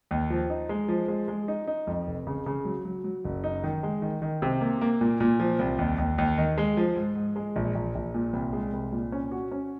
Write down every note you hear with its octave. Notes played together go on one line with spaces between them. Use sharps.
D#2
F3
D#4
G#3
F3
G#3
G#3
D#4
D#4
F2
F1
C#3
C#3
F#3
F#3
F#3
F#1
D#4
D#3
G#3
D#3
D#3
C3
A#3
A#3
A#2
A#2
F3
C2
D#2
D#2
D#2
D#3
G#3
F3
G#2
G#2
G#3
A#1
A#1
A#1
A#2
C2
G#3
C2
A#2
C#4
F#4
C#4